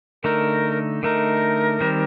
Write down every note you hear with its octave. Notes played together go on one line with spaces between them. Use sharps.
D3 A3 D#4 A#4
D3 A3 D#4 A#4
D#3 G3 C4